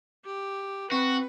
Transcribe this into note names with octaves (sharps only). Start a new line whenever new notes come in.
G4
C4 F#4 B4